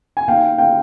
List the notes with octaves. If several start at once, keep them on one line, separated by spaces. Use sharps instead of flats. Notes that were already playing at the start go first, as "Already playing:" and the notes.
G#5
D#2 F5 G5
F5 G5